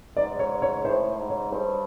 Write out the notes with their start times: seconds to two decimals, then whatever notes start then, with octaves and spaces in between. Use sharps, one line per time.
0.17 G#2 D5
0.39 C#5
0.62 C#5
0.85 A2 C5
1.19 G#2
1.30 C#5
1.52 G2 C5